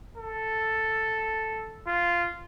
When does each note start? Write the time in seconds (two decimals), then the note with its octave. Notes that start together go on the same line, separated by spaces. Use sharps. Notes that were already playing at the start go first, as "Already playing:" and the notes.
0.18 A4
1.87 F4